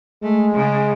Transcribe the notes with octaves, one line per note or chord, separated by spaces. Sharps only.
G#3 A3
C#3